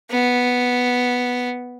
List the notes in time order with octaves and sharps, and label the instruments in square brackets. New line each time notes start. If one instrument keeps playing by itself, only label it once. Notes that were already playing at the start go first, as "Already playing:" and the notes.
[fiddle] B3